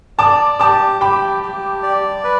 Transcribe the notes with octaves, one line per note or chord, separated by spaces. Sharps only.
D5 A5 D6
G4 A5 D6
G4 G5 B5
G4
D5
B4